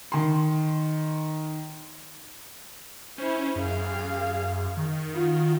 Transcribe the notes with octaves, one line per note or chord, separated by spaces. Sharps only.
D#3 C6
C#4 E4 C5
F#2 G#4 F5
D#3
F4 F#4